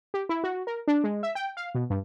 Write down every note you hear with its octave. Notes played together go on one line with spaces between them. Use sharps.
G4
E4
F#4
A#4
D4
G#3
E5
G5
F5
B2
G2